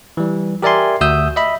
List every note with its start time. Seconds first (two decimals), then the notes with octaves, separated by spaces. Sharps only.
0.17 E3 G3
0.62 G4 A#4 D5 E5 G#5 C6
1.01 D2 F#4 E5 D#6 E6 G6
1.36 D#5 E5 B5